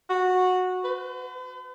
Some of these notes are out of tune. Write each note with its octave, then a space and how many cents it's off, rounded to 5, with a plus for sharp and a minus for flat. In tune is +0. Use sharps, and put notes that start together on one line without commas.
F#4 -15
B4 +45